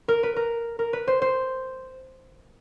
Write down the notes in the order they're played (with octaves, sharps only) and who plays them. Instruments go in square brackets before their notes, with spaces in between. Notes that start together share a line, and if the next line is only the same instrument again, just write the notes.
[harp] A#4
B4
A#4
A#4
B4
C5
C5